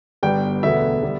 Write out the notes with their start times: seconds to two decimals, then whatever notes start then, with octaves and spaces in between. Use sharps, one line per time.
0.23 G1 G2 G3 B3 G5
0.63 E1 D2 D3 B3 E5
1.03 D3 G3 B3